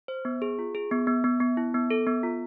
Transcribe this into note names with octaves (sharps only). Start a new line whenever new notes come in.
C5
B3
G#4
F4
G#4
B3
B3
B3
B3
E4
B3
A4
B3
F4